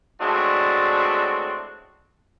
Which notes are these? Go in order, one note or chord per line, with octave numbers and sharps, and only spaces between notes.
A2 G#3 C4 D4 F#4